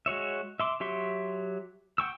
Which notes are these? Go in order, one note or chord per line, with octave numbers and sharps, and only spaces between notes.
G#3 F#4 C#5 E5
E5 C6 D6
F#3 G4 E5 C6 C#6
F#5 G5 C#6 E6